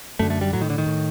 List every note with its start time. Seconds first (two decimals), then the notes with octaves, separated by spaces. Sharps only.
0.19 F#2 D3 A3
0.30 A3
0.41 G3
0.53 A2 F#3
0.61 D#3
0.70 D3
0.78 D#3
0.86 A2